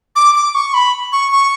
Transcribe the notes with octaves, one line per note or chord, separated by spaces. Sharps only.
D6
D6
C#6
B5
C#6
C#6